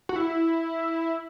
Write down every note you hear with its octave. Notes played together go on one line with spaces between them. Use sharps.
F#4
E4